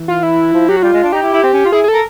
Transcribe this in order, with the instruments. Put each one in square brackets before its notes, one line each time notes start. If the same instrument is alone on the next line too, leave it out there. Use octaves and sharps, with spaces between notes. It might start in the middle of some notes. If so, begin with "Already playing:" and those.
Already playing: [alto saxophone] E3
[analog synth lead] F4
E4
[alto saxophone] F3
[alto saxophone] F#3 [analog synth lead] G4
[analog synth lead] F#4
[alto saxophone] G3 [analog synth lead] F4
[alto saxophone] G#3
D4
[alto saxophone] D#4 [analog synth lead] G4
[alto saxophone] E4
E4
C4
C#4
F4
[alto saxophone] E4 [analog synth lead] G#4
[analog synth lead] G#4
[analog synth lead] A4 [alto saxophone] A#4